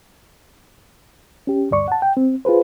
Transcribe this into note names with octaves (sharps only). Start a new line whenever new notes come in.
C#4 G4
D2 G2 D5 C#6
F#5 A5
G5
C4
F4 G#4 B4 C5